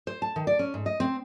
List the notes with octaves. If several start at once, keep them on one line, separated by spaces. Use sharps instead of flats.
C5
A5
D#3
D5
C#4
G#2
D#5
C4